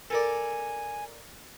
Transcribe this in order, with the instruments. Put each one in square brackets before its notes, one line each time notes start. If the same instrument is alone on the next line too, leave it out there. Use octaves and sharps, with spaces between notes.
[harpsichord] A4 A#4 D5 [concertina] G#5